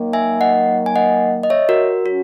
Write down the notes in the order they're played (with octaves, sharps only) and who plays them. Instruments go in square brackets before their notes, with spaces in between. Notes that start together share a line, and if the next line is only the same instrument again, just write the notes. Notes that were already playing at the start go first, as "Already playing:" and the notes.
Already playing: [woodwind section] D#3 F#3 A#3
[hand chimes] E5 G#5
D#5 F#5
G#5
D#5 F#5
D#5
C#5 E5
F#4 A#4
[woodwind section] F#3 C#4 [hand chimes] F#4